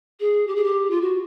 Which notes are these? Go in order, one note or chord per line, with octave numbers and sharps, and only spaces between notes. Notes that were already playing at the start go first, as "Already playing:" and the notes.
G#4
G4
G#4
G4
F4
F#4